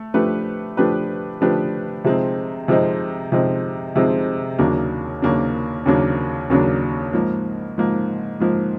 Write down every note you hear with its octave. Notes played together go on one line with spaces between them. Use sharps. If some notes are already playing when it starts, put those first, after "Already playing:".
Already playing: A3
F3 A3 D4 G4 B4
F3 A3 D4 G4 B4
F3 A3 D4 G4 B4
C3 F3 G#3 C4 D#4
C3 F3 G#3 C4 D#4
C3 F3 G#3 C4 D#4
C3 F3 G#3 C4 D#4
D#2 C#3 F#3 A#3 D4
D#2 C#3 F#3 A#3 D4
D#2 C#3 F#3 A#3 D4
D#2 C#3 F#3 A#3 D4
G#2 F3 A#3
G#2 F3 A#3
G#2 F3 A#3